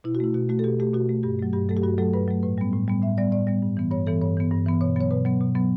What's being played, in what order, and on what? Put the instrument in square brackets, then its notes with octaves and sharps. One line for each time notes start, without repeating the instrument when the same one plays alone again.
[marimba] B2 E4
F#4
A3 E4
B2 F#4
A3 F#4
A4
B2 G4
A3 G4
B2 F#4
A3
G2 G4
F#3 A3
G2 G4
F#3 A3 A4
G4
G2 F#4
F#3 A3 A4
G2 B4
F#3 A3
A2 B4
G3 B3
A2
G3 B3
A2 E5
G3 B3 D5
A2 D5
G3 B3
G2
E3 B3
G2 C#5
E3 B3 A4
G2 C#5
E3 B3
G2
E3 B3
B2 C#5
F#3 B3 C#5
B2 B4
F#3 B3
B2
F#3 B3